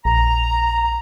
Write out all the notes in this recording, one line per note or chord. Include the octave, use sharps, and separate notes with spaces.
A#1 A#5